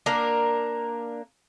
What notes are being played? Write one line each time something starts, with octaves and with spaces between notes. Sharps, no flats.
A#3 D4 A#4